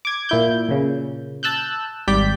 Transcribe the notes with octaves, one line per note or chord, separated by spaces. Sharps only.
D6 G#6
A#2 E4 G6
A#2 C#3
A5 E6 F#6 G6
G#1 G3 D5 G6 B6